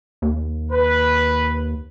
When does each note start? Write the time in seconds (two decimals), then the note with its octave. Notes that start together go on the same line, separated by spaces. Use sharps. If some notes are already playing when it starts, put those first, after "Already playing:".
0.22 D#2
0.72 B4